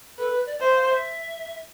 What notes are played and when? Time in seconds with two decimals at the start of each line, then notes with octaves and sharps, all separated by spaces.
0.18 A4 B4
0.33 B4
0.46 D5
0.60 C5 E5
0.74 F5
0.89 E5